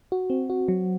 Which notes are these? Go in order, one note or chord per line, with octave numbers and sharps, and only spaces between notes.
F#4
C4
F#4
F#3